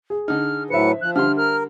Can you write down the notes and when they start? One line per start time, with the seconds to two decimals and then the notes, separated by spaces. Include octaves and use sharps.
0.10 G#4
0.28 D3 D#4 F6
0.70 A2 F#3 B4 C5 E5 C#7
1.01 F3 F#6
1.16 D3 G3 C6 F6
1.37 A#4 F6